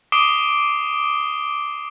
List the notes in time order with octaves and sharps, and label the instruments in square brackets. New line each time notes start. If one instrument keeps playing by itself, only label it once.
[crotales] D6 D#6 C7 D7 E7 G7